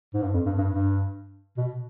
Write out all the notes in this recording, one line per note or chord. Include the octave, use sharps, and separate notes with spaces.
G#2
G2
F2
G2
G2
G2
B2